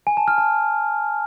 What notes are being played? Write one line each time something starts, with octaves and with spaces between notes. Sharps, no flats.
G#5
A5
F6
A5